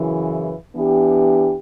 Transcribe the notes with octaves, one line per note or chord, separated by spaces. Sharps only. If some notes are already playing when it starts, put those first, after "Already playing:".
Already playing: F#2 C#3 E3
E3 B3 D4 G4